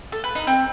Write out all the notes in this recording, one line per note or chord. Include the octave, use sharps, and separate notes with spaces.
A4
B4
D#4
C4